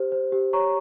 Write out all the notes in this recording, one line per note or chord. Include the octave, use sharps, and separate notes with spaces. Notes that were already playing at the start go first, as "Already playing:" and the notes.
Already playing: G4 C5
C5
G4
C#5 A#5 C#6